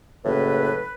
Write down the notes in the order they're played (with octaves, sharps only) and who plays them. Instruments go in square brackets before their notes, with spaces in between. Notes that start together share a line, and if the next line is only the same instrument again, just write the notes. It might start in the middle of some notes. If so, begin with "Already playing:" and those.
[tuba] F#1 [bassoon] A2 [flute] B4